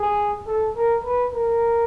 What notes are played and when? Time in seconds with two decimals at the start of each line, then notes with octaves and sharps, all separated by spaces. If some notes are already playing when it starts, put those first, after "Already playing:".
Already playing: G#4
0.47 A4
0.75 A#4
1.03 B4
1.32 A#4